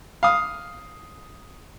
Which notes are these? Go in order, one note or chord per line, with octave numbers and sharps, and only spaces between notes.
F5 D#6